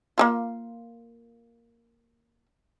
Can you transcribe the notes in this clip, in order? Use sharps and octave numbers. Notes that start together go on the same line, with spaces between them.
A#3 E4 F4